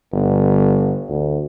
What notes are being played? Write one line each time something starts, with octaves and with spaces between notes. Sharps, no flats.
G1
D2